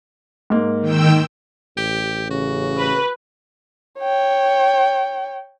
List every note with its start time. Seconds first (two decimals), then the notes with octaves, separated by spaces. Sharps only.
0.50 G#2 A#3
0.81 D#3 G5 E6
1.77 A1 G4
2.30 C#3 F#4
2.78 B4
4.00 C#5 G5